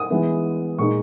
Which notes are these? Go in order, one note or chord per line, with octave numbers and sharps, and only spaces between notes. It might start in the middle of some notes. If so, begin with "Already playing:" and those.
Already playing: D#6
E3 G#3 B3 E4
A#2 G#3 D#4 C#6